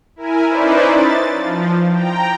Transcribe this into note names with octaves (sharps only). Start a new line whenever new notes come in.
E4 A#4 G#5
C#4 D#4 E4 B4 C5 D5
A6
F3
G5 A#5